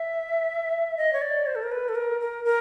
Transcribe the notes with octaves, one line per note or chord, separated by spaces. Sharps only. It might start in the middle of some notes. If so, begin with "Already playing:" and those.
Already playing: E5
D#5
C#5
D5
C5
A4
A#4
B4
A4
A#4
A#4
A#4